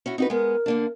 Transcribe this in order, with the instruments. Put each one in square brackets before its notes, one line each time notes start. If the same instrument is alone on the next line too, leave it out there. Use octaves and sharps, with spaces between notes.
[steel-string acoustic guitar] C#4 E4 F#4
[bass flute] C4 [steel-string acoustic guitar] D#4 F#4 B4
[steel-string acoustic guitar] G#3 B3 [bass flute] A#4
[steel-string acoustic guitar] D3 A#3 D4